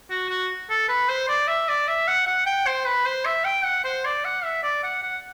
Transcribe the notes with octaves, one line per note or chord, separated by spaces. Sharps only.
F#4
F#4
A4
B4
C5
D5
E5
D5
E5
F#5
F#5
G5
C5
B4
C5
E5
G5
F#5
C5
D5
F#5
E5
D5
F#5
F#5